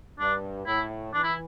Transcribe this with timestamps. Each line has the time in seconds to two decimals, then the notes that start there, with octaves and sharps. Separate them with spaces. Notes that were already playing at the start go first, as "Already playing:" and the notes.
0.19 G2 D4
0.66 A2 E4
1.13 E3 D4
1.24 E4